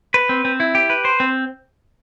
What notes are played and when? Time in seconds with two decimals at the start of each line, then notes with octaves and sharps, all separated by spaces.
0.14 B4
0.29 C4
0.45 C4
0.60 E4
0.75 G4
0.90 B4
1.05 C5
1.20 C4